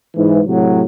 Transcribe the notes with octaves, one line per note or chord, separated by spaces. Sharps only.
G#2 E3
A2 C3 F#3